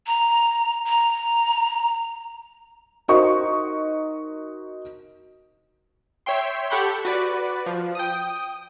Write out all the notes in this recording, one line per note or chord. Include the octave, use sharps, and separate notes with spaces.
A#5
A#5
D#4 F#4 A#4 C5 D#5 C#6
C#5 E5 G5 C6
G4 A4 F#5 B5 C#6 G6
F#4 B4 D5
F3
G5 D#6